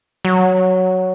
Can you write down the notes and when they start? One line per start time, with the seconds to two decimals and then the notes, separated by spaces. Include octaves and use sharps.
0.25 F#3